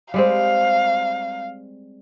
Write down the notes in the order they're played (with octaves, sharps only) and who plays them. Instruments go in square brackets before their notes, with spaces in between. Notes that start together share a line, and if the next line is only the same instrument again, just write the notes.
[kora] G3 G#3 C4 [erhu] F5